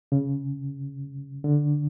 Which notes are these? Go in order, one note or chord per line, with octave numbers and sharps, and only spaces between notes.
C#3
D3